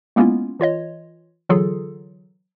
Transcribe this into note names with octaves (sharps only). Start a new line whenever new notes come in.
G#3 A#3 B3 C#4 E4 F4
E3 F4 C#5 D#5
D3 E3 F#3 F4 G#4 A4